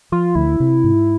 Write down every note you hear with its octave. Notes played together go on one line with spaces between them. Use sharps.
F3 F4
D2 E4
C3
G#2